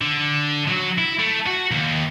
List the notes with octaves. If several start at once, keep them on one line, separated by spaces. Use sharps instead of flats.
D3
F#3 F#4
E4
A3
F#4
D#2